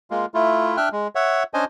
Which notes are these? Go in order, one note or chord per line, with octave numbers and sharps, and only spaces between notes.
G#3 A#3 F4
A3 E4 F4
D4 E5 G5 F6 F#6
G#3
C#5 E5 F#5
C#4 D4 C5 D#5 G#5